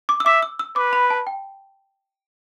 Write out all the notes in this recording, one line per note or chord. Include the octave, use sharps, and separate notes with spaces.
D6
E6
E5 D6
E6
E6
B4 D6
B5
A5
G5